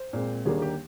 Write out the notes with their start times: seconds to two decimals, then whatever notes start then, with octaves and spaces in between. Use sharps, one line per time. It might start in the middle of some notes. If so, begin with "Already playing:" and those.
Already playing: C5
0.13 A#2 G#3 C4
0.45 D#2 D3 G3 A#3 G#4
0.62 G4